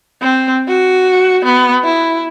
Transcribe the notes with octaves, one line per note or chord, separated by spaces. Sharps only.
C4
F#4
B3
E4